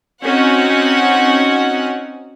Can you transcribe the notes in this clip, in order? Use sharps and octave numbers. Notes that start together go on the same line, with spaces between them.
C4 C#4 D#4 F#4 F#5